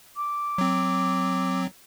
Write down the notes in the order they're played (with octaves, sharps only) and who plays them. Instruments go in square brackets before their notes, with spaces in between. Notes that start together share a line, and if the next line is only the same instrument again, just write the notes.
[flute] D6
[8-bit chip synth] F#3 C4